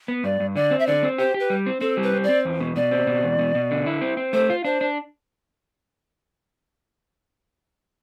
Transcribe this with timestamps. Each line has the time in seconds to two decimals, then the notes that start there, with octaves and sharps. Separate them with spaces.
0.08 B3
0.24 G2 D5
0.40 G2
0.55 D3 D5
0.71 C4
0.79 E5
0.87 D3 D5
1.03 C4
1.18 G4 C5
1.34 G4
1.40 B4
1.50 G3
1.66 C4
1.81 C4 A4
1.97 G3
2.03 B4
2.13 C4
2.24 D5
2.29 C4
2.45 E2
2.60 B2
2.76 B2 D5
2.91 C4
3.07 B2
3.23 E2
3.39 B2
3.55 B2
3.71 D3
3.86 E4
4.01 C4
4.17 C4
4.33 A3 C5
4.50 F4
4.64 D4 C5
4.81 D4